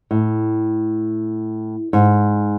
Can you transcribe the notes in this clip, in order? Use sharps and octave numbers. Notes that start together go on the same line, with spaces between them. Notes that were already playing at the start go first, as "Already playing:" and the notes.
A2
G#2